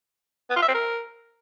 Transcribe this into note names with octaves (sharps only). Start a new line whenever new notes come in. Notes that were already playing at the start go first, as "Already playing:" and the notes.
B3
F4
E5
C4
A#4